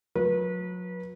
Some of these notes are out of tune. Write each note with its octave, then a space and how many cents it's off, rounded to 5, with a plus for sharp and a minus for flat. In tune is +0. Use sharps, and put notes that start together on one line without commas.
F#3 -35 B4 -30